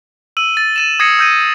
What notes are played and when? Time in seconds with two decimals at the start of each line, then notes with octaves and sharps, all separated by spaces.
0.37 E6 D#7 F#7
0.57 A6
0.76 A6 D#7 E7
1.00 D#6 G#6 A#6 C7 C#7
1.19 E6 G6 A#6 D#7